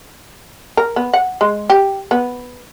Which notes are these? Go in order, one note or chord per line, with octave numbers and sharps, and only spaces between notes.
A#4
B3
F#5
G#3
G4
B3